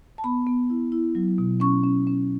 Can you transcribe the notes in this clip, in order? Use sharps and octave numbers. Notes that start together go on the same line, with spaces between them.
A5
B3 B5
B3
E4
E4
F#3
B2
C#4 C#6
C#4
C#4